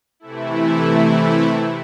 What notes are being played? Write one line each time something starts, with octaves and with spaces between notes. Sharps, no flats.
C3 E3 A3 E4